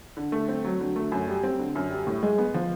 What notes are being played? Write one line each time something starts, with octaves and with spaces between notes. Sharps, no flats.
D3
A3
C4
F#3
D3
A3
F#2
G3
C4
D3
F#2
G3
A2
G#3
B3
F3